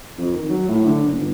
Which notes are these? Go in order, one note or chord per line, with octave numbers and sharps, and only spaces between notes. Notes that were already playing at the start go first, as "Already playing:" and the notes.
F2
D#3
F#3
A2
D3
F#1
G1